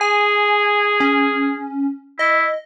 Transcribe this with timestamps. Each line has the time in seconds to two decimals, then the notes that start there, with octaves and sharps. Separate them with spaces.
0.01 G#4 G#5
1.00 C#4
2.19 E4 D#5